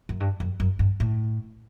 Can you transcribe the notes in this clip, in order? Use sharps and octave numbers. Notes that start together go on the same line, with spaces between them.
F#2
G2
F#2
F#2
G2
A2